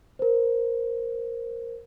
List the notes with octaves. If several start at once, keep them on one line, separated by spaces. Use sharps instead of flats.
A#4 C5